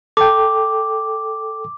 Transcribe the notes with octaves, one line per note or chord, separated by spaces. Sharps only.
A4 G5 D6